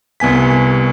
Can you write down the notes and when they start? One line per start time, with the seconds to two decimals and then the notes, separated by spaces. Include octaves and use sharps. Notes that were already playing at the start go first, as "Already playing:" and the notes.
0.20 C2 B3 G#5 B6